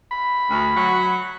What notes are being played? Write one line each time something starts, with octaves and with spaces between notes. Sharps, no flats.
B5
D2
F#3 F#5